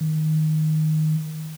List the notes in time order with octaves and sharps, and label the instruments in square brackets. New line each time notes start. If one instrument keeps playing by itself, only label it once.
[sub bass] D#3